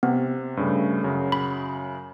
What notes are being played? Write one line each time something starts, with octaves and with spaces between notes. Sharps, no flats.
C3 B3
G2 C#3 A3
F#2 C#3 F#3
B5